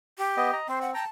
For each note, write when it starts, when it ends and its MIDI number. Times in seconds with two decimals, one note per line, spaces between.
0.18 0.54 67
0.37 0.51 59
0.37 0.51 75
0.53 0.67 75
0.53 0.67 82
0.68 0.94 60
0.68 0.79 72
0.81 0.93 78
0.94 1.05 79
0.94 1.10 81
0.94 1.05 82